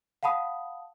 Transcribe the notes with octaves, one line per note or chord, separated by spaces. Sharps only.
F5 F#5 A5 B5 D#6